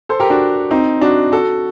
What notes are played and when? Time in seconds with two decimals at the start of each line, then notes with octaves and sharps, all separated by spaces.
0.09 A4 C5
0.20 G4 A#4
0.30 D4 F#4
0.71 C4 D#4
1.01 D4 F#4
1.32 F#4 A4